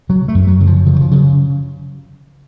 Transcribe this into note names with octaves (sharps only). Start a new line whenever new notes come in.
C#3 F#3
A3
F#2
F#3
C#3
F3
C#3 F3
D#3
F3
C#3 F#3